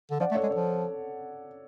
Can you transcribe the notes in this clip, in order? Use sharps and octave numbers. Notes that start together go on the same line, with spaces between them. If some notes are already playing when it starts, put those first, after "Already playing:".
D3
F3 D5 F#5
A3
A4 C#5
G#3
F3 A4 C#5